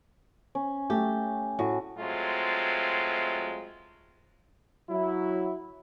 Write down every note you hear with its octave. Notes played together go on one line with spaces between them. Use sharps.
C#4
A3 G4
A2 F#4
F#3 G#3 A3 C4 F4
F#3 E4